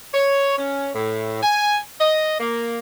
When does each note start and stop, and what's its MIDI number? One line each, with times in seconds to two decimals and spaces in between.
0.14 0.54 73
0.58 0.90 61
0.94 1.41 45
1.43 1.78 80
2.01 2.36 75
2.40 2.78 58